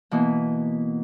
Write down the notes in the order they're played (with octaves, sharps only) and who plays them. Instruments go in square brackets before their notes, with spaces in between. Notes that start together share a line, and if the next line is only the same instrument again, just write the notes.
[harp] B2 E3 A#3